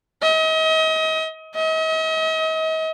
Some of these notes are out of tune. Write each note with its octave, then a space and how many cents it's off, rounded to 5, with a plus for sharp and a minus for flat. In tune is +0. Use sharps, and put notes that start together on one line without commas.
D#5 +35
D#5 +40